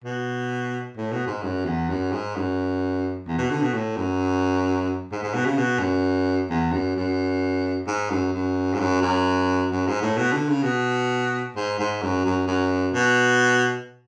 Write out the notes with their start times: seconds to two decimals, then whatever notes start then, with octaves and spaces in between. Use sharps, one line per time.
0.04 B2
0.97 A2
1.12 B2
1.27 G#2
1.42 F#2
1.65 E2
1.89 F#2
2.12 G#2
2.36 F#2
3.27 E2
3.38 B2
3.51 D3
3.62 B2
3.74 A2
3.96 F#2
5.12 G#2
5.23 G#2
5.34 B2
5.46 C#3
5.58 B2
5.80 F#2
6.50 E2
6.72 F#2
6.96 F#2
7.87 G#2
8.10 F#2
8.33 F#2
8.73 G#2
8.80 F#2
9.02 F#2
9.71 F#2
9.87 G#2
10.02 A2
10.17 B2
10.32 D3
10.49 C#3
10.63 B2
11.56 G#2
11.79 G#2
12.02 F#2
12.25 F#2
12.47 F#2
12.94 B2